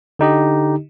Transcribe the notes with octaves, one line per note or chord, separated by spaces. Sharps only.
D3 D#4 G4 D#5